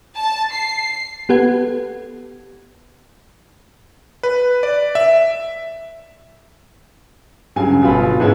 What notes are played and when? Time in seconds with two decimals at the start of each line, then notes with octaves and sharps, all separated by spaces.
0.18 A5
0.53 C7
1.29 B3 G4 A4 B4 F#5 G#6
4.23 B4
4.63 D5
4.95 E5
7.56 G2 C#3 F#3 G#5
7.82 G1 B2 F4 B5
8.20 G#2 G#3 A3 B3 C#4 E4